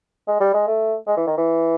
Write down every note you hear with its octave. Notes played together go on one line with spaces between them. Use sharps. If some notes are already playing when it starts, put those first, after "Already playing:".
G#3
G3
G#3
A3
G#3
E3
D#3
E3